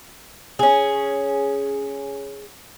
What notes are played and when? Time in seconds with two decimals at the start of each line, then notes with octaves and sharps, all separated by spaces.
0.59 C#4 G#4